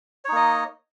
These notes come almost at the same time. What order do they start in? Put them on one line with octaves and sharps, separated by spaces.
C#5 D#4 A#3 D#5